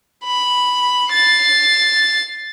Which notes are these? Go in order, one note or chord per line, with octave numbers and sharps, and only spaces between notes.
B5
A6 C7